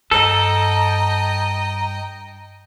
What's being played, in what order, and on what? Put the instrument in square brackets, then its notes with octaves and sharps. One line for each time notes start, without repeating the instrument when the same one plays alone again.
[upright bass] G2 [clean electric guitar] A4 [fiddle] D#5 G5 [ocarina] A#5